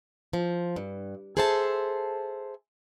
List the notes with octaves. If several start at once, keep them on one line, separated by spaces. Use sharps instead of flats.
F3
G2
G#4 A4 C5 E5 A5